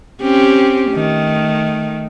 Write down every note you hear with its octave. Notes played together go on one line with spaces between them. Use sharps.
C4 C#4 G4
D#3 A3